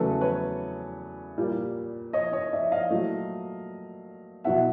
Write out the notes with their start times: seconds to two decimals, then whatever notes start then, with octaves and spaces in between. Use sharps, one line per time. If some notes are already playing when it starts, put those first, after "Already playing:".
Already playing: E2 C#3 F#3 A3 A4 B4
0.21 B4 C#5
1.38 A#2 G3 A#3
2.13 C#5 D#5
2.33 C#5 D#5
2.53 D5 E5
2.71 D#5 F5
2.90 A#2 F#3 A3
4.44 B2 F#3 B3 E5 F#5